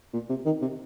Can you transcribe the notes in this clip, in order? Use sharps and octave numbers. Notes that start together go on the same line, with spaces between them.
A#2
C3
D#3
C3